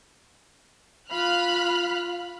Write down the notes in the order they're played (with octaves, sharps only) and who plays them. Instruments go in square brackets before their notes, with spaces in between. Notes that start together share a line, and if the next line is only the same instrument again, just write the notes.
[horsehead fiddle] F4 F5 [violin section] B5 F6 F#6